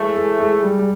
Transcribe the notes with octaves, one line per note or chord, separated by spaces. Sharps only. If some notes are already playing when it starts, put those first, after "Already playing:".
Already playing: A2 E3 G#3 A3
G#3
G#3
G3
G3